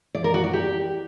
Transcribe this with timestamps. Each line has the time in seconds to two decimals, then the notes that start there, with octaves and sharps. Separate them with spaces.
0.15 D5
0.24 A#4
0.34 F#4
0.44 D5
0.53 G4